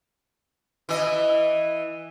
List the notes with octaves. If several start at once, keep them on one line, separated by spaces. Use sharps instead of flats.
E3 D#5